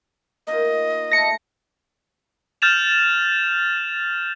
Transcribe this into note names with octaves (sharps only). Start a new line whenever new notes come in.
A#3 D#4 F4 D#5
A3 A4 A#6 C#7
F6 G6 A6 E7 F7